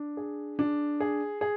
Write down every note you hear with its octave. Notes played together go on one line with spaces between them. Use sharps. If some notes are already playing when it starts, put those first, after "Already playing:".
Already playing: D4
G#4
D4
G#4
G#4